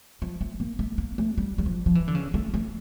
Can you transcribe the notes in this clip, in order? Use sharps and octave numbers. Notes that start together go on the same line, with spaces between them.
F3
A3
A#3
A3
A#3
A3
G3
G3
F3
F3
E3
D3
C#3
A3
A3